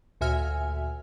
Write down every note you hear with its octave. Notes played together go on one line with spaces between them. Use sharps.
D2 A#2 F#4 E5 G#5 F6